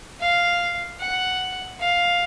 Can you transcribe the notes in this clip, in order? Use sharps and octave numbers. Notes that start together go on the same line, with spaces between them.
F5
F#5
F5